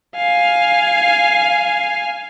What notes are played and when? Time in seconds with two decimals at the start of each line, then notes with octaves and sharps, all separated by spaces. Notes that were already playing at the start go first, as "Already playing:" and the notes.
0.16 F5 G#5